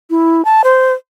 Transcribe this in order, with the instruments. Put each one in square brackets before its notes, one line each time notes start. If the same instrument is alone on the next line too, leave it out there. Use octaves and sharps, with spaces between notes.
[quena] E4
A5
C5